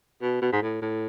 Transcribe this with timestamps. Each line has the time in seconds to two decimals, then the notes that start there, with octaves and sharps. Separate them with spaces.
0.22 B2
0.42 B2
0.53 G#2
0.62 A2
0.82 A2